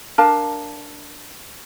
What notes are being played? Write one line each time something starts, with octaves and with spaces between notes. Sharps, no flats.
D4 A#4 F5 A5